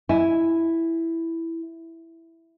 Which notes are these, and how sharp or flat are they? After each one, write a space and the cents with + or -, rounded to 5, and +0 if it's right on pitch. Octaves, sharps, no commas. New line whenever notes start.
E4 +0 G#5 +0